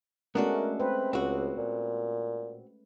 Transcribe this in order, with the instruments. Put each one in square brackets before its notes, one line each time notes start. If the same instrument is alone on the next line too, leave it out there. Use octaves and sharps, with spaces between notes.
[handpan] G#3 A3 C#4 [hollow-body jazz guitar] B3 D4 F#4 [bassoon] A#4
[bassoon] C4 [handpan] B4
[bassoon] C#2 [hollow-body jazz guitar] C4 F#4
[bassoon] A#2